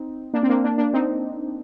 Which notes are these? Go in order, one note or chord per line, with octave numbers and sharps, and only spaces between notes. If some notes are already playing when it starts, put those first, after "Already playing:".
Already playing: C4 D#4
A#3 D4
C4
A#3 D4
A#3 D4
A#3 D4
C4 D#4